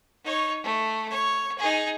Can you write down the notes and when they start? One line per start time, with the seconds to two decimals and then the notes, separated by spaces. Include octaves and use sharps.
0.24 D#4 C#5
0.63 A3
1.11 C#5
1.58 D#4 G#4